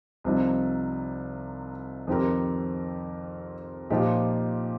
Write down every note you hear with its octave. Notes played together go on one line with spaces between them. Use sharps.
C2 C3 F3 D#4
F2 D#3 C4 G4 A#4
A#2 F3 D#4 G4